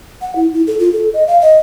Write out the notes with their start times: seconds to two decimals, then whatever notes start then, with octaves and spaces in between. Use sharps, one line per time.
0.22 F#5
0.36 E4
0.53 E4
0.67 A4
0.79 F4
0.93 A4
1.14 D#5
1.28 F5
1.41 D#5